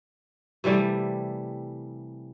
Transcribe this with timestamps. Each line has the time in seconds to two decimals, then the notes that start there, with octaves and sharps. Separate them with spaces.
0.64 C3 E3 G3 A3